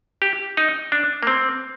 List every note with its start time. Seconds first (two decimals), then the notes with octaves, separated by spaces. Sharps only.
0.22 G4
0.57 D#4
0.92 D4
1.23 A#3
1.27 C4